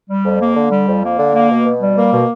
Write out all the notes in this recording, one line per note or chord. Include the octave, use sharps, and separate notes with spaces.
G3
F2
A#3
D3
G3
F2
A#3
D3
A#3
B2
B2
G3
A#3
B2